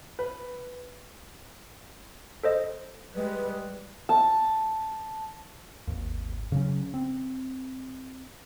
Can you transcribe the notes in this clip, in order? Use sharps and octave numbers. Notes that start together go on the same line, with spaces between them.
B4
A4 C5 D#5
G3 G#3 B4
A5
G#1 D#2
C#3 F#3 C#4
C4